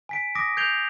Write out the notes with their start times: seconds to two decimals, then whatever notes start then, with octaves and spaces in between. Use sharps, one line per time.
0.09 G#5 B6 D7
0.35 D6 D#6 A#6 D7
0.57 G6 G#6 C7 D7 F7 G7